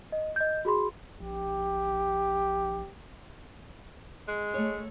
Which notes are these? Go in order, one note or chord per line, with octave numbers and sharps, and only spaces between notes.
D#5
D#5 G6
F#4 G#4 B5 C6
A#1 G4
G#3
A3 C#5